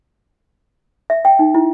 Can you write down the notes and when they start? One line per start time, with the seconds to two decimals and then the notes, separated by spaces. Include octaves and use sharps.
1.10 E5
1.25 G5
1.39 D#4
1.55 E4